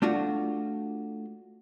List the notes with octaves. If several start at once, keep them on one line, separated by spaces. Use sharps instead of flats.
A3 D4 F4 F#4